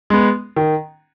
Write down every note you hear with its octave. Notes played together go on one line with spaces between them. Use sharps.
G#3 B3
D#3